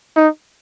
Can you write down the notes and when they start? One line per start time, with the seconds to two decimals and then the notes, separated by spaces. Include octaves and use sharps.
0.16 D#4